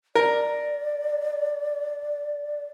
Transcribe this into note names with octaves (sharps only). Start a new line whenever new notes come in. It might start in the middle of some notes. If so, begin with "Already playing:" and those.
A#4 D5